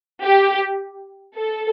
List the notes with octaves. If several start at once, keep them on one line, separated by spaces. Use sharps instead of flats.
G4
A4